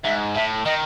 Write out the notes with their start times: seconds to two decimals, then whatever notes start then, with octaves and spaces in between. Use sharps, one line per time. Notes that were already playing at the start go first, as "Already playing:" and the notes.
0.04 G#2 E5
0.35 A2 E5
0.65 D#3 D#5